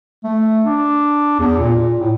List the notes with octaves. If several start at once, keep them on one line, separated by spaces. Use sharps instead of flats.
A3
D4
E2
A#2
A#2
A2